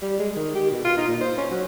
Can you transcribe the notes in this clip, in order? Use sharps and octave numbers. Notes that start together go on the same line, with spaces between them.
G3
G#3
D#3
G4
B2
F4
D#4
A#2
C5
C#4
F#3